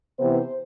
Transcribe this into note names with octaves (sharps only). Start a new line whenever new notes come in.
C3 E3 B3 C5